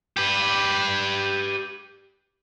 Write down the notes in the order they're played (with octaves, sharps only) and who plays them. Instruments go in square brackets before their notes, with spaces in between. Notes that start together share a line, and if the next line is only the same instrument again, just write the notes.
[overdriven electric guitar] G4 B4